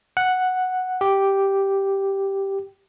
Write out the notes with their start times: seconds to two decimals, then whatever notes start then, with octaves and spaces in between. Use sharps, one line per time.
0.17 F#5
1.01 G4